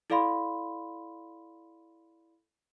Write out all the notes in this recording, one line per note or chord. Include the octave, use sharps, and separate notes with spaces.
E4 A4 D5 F5 B5 C6